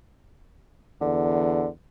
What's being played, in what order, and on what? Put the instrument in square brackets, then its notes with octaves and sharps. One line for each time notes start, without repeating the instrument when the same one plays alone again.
[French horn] E2 [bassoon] D3